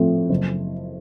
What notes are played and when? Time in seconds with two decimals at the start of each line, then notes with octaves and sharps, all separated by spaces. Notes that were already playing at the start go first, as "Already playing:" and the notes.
Already playing: A2 F3 A3 C4
0.30 F#1